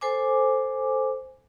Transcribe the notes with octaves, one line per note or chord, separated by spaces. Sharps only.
A4 C5 G#5 D6